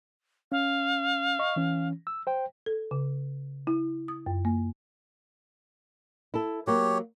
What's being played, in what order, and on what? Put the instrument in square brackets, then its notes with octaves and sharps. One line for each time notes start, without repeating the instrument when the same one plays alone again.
[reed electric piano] C#4 [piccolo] F5
[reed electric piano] D#5 C#6
E3 C#4
E6
C5 G5
[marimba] A4
C#3
E4
D#6
F#2
A#3
[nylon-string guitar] E4 A4
[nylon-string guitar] F#3 A#3 [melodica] G4 C#5